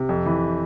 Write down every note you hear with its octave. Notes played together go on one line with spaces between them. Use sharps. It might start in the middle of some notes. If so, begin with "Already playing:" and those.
Already playing: C3
F2
E3